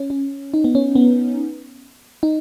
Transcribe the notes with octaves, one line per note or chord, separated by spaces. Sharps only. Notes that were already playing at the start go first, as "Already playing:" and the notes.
Already playing: C#4
C#4
D#4
B3
C#4
B3
D#4